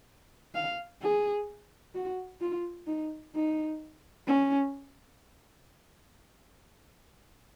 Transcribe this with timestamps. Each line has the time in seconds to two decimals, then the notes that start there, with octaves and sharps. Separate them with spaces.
0.55 F5
1.02 G#4
1.95 F#4
2.41 F4
2.87 D#4
3.35 D#4
4.27 C#4